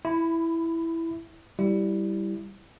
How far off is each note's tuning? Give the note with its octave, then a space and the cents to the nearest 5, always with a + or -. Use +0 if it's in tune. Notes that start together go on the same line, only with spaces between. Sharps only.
E4 +0 B5 +20
G3 -5 E4 +0